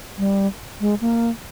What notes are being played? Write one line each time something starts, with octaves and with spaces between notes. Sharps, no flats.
G3
G#3
A#3